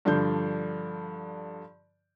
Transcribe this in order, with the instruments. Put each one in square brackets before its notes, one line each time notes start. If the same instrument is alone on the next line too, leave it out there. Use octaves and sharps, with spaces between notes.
[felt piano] G2 D3 F3 D4 G6